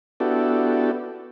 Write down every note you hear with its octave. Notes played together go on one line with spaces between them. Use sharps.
B3 D4 E4 F#4 G4 A4